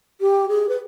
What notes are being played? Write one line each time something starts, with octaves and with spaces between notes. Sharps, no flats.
G4
G#4
B4